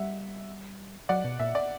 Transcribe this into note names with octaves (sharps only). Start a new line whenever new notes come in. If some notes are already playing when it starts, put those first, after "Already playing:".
Already playing: G3 E5 F#5
F#3 D5 F#5
B2
A#2 E5
D5